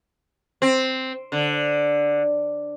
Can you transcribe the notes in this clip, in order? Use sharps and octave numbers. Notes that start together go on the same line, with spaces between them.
C4
D3